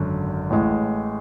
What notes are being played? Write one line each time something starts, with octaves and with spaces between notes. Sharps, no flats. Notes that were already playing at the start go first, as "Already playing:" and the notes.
Already playing: G#1 F#2 D3
A1 A2 G#3